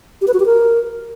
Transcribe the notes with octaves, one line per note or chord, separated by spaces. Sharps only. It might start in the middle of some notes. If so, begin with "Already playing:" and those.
G4
B4
F#4
G4
A#4